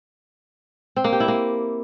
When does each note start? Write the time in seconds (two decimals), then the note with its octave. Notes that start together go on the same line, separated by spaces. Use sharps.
0.96 C4
1.04 A#3
1.12 G4
1.20 E4
1.28 A#3